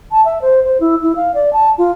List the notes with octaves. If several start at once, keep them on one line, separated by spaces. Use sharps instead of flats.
A5
E5
C5
C5
E4
E4
F5
D5
A5
F4